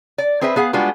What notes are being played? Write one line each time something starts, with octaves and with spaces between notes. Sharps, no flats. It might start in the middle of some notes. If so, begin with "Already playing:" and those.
D5
C4 G#4 B4 C5 E5
B3 G#4 F5 F#5
G3 G#3 B3 D4 F4 F#4